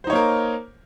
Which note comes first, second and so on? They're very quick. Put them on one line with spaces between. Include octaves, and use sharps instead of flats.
C5 D#4 C#5 A#3 A#4